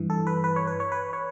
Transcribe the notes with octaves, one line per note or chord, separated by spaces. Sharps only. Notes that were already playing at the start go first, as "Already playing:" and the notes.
Already playing: G2 E3
A4
B4
B4
C#5
B4
C#5
B4
C#5